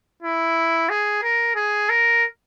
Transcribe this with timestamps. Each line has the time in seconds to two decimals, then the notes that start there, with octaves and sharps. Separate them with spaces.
0.22 E4
0.89 G#4
1.23 A#4
1.55 G#4
1.90 A#4